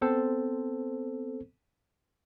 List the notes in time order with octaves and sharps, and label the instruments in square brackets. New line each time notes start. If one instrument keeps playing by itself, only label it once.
[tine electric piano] B3 C4 A4 C5